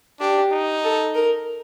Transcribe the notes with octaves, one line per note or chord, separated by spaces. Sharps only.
D4 G4
D#4
A4
A#4